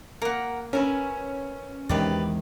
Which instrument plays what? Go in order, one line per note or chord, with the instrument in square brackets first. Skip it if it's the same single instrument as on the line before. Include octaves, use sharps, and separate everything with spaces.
[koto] A#3 [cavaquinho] A#4 F#5
[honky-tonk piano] C#4 [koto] A#4 B4 [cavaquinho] E5 G#5
[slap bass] E2 G#3 [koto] C3 D#3 [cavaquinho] G4 B4 D5